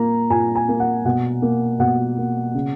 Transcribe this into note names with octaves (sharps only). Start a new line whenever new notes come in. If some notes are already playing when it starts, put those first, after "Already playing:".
Already playing: A#2 A#3 A#5
A#2 G#5
G#5
A#3
F#5
B2 F#5
A#3
B2 F#5
A#3
C#3